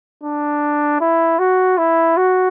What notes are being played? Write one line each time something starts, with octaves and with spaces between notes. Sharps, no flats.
D4
E4
F#4
E4
F#4